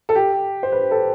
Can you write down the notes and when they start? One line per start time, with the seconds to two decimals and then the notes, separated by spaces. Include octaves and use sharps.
0.09 A4
0.15 G4
0.63 C5
0.72 B4
0.91 A4